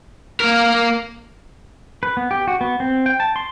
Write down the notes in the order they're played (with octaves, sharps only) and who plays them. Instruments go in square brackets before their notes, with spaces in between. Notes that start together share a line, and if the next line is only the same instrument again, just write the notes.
[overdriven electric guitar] A#3 A#4
[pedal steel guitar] B4
B3
G4
F#4
B3
C4
G5
A5
C6